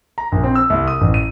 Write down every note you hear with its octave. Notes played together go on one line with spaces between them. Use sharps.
A#5
A#1
C4
E6
C2
D#6
A1
D#7